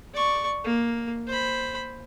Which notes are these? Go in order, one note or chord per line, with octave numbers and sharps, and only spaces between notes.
D5 C#6
A#3
C5 B5